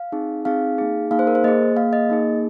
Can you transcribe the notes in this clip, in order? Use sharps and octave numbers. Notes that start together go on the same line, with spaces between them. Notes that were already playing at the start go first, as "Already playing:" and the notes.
Already playing: F5
C4 D#4 G#4
C4 D#4 G#4 F5
A#3 D#4 G#4
A#3 D#4 G#4 F5
C5
A#4
C5
A#3 G#4 D#5
A#3 G#4 F5
D#5
A#3 D#4 G#4